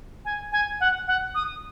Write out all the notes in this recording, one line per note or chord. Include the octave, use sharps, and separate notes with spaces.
G#5
G#5
F#5
F#5
D#6